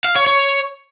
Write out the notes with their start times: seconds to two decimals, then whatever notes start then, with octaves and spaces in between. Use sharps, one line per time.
0.04 F5
0.16 C#5
0.27 C#5